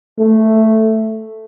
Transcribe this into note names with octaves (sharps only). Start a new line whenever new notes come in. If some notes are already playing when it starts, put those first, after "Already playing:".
A3